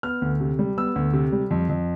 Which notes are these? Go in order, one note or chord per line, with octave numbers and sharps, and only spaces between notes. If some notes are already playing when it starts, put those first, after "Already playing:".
B3 F6
D2
C3
G3
B3 E6
D2
C3
G3
F2
F2